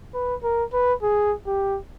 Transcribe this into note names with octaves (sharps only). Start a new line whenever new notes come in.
B4
A#4
B4
G#4
G4